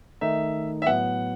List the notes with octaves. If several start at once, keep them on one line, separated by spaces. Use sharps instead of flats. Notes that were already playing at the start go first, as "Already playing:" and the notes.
D#3 A3 D#4 E5
E5
A2 F#3 B3 F#5